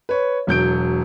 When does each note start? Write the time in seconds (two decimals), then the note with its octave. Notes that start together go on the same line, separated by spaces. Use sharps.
0.09 B4 C#5
0.47 E1 F#3 G6 D7